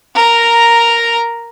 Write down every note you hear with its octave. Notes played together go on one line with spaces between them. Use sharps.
A#4 A#5